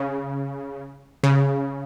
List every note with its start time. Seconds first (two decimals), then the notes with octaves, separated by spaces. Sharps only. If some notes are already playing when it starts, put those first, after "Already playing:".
Already playing: C#3
1.24 C#3